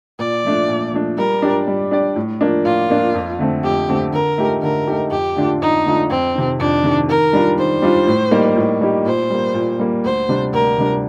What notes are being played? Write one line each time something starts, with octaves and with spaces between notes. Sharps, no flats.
A#2 D5
F3 A3 D4
A#2
F3 A3 D4
G3 A#4
D4 G4 D5
G3
D4 G4 D5
A2
F3 A#3 D4
A2 F4
F3 A#3 D4
F2
D3 A3 C4
F2 G4
D3 A3 C4
D3 A#4
A3 D#4 G4
D3 A#4
A3 D#4 G4
F2 G4
D3 A3 D4 F4
F2 D#4
D3 A3 D4 F4
F2 C4
C3 D#3
F2 D4
C3 D#3
D#3 A#4
G3 D4 F4
D#3 C5
G3 D4 F4
A2
G3 A#3 D#4 G4
A2
G3 A#3 D#4 G4
A#2 C5
G3 A#3
A#2
G3 A#3
D2 C5
C3 G3 D4
D2 A#4
C3 G3 D4